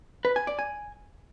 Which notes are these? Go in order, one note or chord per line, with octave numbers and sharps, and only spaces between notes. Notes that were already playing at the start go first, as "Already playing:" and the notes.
B4
G#5
D5
G#5